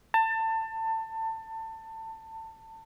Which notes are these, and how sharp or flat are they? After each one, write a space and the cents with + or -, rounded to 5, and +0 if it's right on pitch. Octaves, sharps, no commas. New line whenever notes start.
A5 +25